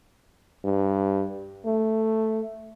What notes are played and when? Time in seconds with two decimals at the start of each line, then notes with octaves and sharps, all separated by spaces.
0.65 G2
1.65 A3